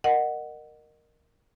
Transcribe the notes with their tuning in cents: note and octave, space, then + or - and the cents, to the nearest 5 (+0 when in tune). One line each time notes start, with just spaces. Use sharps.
A#4 +0 D#5 -30 F#5 +0